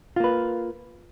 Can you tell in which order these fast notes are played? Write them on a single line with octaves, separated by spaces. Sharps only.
F4 A#3 B4